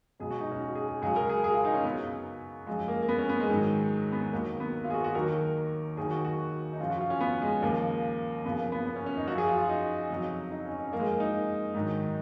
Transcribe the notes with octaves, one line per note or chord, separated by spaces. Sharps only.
C#2 B2 F#3 G#4
F#4
D#4
C#4
F#4
G#4
G#4
C#2 C#3 F#3 G#4
A#4
G#4
G#4
F4
D#4
C#4
F#2 C#3 F#3 B3
F#2 F3 G#3
A#3
A#3
B3
C#4
B3
G#3
G#2 D#3 F#3
B3
D#2 D#3 F#3 A#3
B3
F4
G#4
F#4
F#4
D#2 D#3 F#3 A#4
D#2 D#3 F#3 G#4
F#4
F#4
D#4
F#2 C#3 F3 F4
F#4
F4
C#4
B3
G#3
D#2 C#3 F3 A#3
F#2 C#3 F3 B3
A#3
B3
B3
C#4
C#4
D#4
F#2 F3 F#4
G#4
F4
F4
D#4
F2 C#3 F#3
D#4
C#4
C#4
F#2 F3 A#3
G#3
A#3
D#4
G#2 D#3 F#3